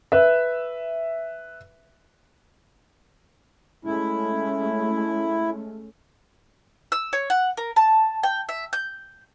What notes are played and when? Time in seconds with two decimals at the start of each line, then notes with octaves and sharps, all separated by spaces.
0.12 B4 E5
3.85 G#3 A3 C#4 E4
6.92 E6
7.13 C#5
7.30 F#5
7.57 A#4
7.76 A5
8.23 G5
8.49 E5
8.73 G6